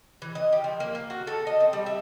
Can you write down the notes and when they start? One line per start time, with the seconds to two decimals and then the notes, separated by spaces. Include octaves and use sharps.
0.22 E3
0.35 D#5
0.52 G4
0.64 F3
0.80 A#3
0.95 A#3
1.10 F#4
1.27 A4
1.47 D#5
1.60 C4
1.73 G3
1.86 E5